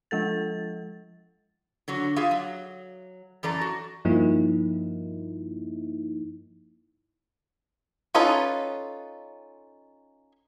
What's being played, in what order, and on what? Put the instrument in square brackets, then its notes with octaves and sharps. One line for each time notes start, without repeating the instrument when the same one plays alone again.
[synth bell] F3 G#3 A4 A6
[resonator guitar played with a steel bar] D3 F#3 F#4
F4 G4 G#4 E5 F5
F#3
F#2 E3 A4 D5 A#5
F#4
[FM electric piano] G2 F3 A#3 D#4 E4
[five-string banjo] C#4 D#4 F4 A4 B4